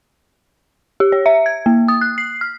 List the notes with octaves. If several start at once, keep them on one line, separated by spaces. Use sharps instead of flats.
G4
C#5
E5
G#6
A#3
D#6
F#6
C7
F6